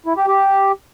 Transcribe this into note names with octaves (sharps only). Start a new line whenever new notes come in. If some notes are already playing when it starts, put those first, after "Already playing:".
E4
G4
G4